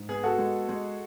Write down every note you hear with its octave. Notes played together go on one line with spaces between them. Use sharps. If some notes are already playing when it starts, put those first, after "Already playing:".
Already playing: G#2
B3 G#4
F#4 A4
G#3
G#3